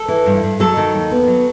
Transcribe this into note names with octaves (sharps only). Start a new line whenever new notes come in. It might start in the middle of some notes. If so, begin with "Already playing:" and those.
Already playing: A4
E3
G2
G2
F#3 A4
D#3
D#2
B3
F#3